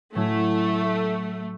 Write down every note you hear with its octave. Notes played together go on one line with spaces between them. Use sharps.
A2 F#3 A3 C#4 E4